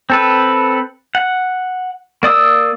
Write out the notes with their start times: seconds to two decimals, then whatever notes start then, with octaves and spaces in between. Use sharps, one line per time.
0.10 C4 A4 B4
1.15 F#5
2.23 A#3 D5 D#6 E6